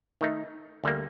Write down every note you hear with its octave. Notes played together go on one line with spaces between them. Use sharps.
D#3 A3 D#4
D2 D3 G3 A#3